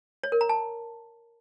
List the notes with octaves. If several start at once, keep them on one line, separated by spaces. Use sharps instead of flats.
C#5
A#4
A#5
A5